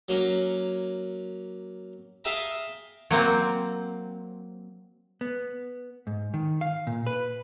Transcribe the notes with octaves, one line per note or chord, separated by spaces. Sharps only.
F#3 A#3 C#4
G#4 E5 F5 G5 A5 A#5
F#3 A#3 C4
B3
G#2
D#3
F5
A#2
B4